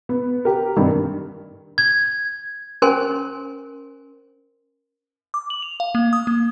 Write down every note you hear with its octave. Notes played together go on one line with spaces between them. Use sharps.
B3
G4 A#4
G2 C3 D#3
G#6
C#4 A#4 C5 G#5 C6
D6
F#7
F7
F5
A#3
D#6
A#3